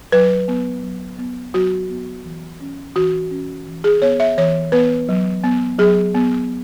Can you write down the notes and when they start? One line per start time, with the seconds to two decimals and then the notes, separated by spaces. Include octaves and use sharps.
0.12 F#3 B4
0.48 B3
0.83 F#3
1.19 B3
1.54 F#3 F#4
1.90 B3
2.24 E3
2.61 C#4
2.96 E3 F#4
3.31 C#4
3.67 E3
3.84 G#4
4.02 B3 C#5
4.20 E5
4.38 E3 C#5
4.72 B3 B4
5.09 F#3
5.44 B3
5.78 F#3 G#4
6.15 B3